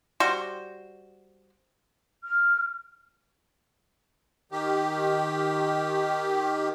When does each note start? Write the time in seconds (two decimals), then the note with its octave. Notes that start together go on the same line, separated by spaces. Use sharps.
0.20 G3 F#4 C5
2.23 F6
4.52 D#3 G4